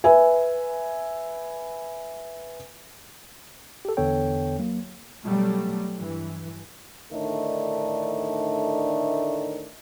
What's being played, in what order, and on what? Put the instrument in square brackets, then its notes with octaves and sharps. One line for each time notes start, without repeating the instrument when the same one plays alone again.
[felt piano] B4 E5 G#5
[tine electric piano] G4 A4
E2 D3 B3 A4 C#5 G5
F#3 A#3
[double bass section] B2 F#3 G3 A3
G2 E3
[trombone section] A2 D3 D#3 A3 D4 D#4